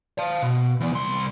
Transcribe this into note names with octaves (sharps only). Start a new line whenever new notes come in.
F5 A5
B2
E3 B3
C2 C6